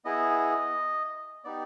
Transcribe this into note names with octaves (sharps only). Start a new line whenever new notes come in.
B3 E4 G#4 D#5
B3 D#4 G4 D5